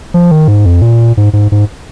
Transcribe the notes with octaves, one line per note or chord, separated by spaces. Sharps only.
F3
D#3
G#2
F2
A#2
G#2
G#2
G#2